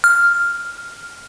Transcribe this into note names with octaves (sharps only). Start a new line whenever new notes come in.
F6